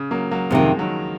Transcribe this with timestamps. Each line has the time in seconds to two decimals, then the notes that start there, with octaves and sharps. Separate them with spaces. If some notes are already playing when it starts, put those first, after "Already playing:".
Already playing: C#3
0.11 F#3 A#3
0.31 F#3 A#3
0.50 F2 C3 D#3 F3 G#3
0.79 D#3 F#3